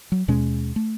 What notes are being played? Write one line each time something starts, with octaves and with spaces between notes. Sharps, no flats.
F#3
D#2 B2 G#3 C#4
A3